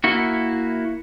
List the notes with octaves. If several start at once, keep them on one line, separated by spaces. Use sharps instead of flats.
A#3 E4 F#4